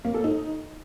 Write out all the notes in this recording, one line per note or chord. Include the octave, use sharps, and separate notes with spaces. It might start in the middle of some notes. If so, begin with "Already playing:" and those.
A#3
A4
D#4